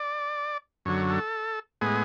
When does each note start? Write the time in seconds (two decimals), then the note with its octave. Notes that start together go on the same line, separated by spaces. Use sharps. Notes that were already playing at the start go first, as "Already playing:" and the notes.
Already playing: D5
0.86 F#2 D3 F#3 C#5
1.10 A4
1.81 A2 G#3 B3 G#4